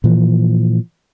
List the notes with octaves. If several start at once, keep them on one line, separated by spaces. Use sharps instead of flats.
A#2 E3 F3